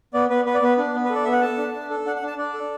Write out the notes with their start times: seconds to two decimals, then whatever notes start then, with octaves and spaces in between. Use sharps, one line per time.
0.14 B3 D5
0.30 B3 B4
0.46 B3 B4
0.55 D5
0.62 B3 B4
0.78 D4
0.94 B3
1.05 B4
1.10 A4
1.15 D5
1.24 B3 E5
1.32 F#5
1.42 A4 A5
1.58 D4
1.74 D4
1.90 A4
2.05 D4 F#5
2.16 F#5
2.22 D4
2.27 A5
2.38 D4 D5
2.54 A4